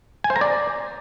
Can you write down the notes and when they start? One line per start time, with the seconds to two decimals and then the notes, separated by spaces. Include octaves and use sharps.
0.24 G#5
0.30 C5
0.36 A#5
0.41 D5